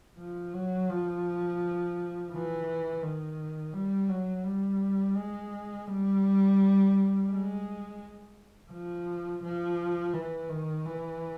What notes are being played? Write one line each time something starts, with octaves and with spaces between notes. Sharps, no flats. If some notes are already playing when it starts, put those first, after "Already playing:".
F3
F#3
F3
E3
D#3
G3
F#3
G3
G#3
G3
G#3
F3
F3
E3
D#3
E3